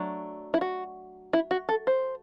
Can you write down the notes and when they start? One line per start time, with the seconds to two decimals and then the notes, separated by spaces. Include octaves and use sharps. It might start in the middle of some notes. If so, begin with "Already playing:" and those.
Already playing: F#3 A3 D4
0.54 E4
0.61 F#4
1.33 E4
1.51 F#4
1.69 A4
1.87 C5